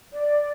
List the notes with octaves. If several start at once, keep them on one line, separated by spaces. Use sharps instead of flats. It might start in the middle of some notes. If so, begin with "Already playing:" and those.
D5